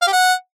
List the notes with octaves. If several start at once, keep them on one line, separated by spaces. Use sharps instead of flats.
F5
G4
F#5